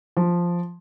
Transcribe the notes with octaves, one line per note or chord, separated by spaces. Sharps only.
F3